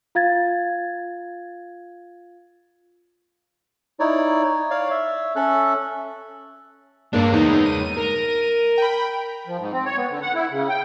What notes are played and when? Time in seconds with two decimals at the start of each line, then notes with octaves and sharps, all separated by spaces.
0.15 F4 F5 G#6 A6
4.00 D#4 E4 C#5 D5
4.71 C#5 D5 F5
4.91 E5
5.36 C#4 A4 E5 F#6
7.13 G2 G#3 A#3 D4 C#5
7.32 E2 D#4
7.66 D#7
7.98 A#4
8.78 G5 B5
9.45 F3
9.58 G#2
9.73 C4
9.85 C#5
9.97 B3
10.10 D3
10.22 F#5
10.34 E4
10.51 C#3
10.69 G5